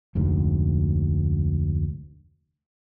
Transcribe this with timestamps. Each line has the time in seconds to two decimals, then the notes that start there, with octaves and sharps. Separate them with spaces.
0.15 F1 D2 G#2